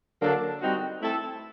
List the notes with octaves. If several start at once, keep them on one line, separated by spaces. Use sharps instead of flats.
D3 F#3 A#3 D4
G3 C4 D#4 F#4
A3 C4 E4 A4